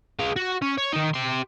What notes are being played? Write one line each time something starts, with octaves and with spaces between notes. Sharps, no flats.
G#3 F5
F#4
C#4
C#5
D#3 D#4
G4 C6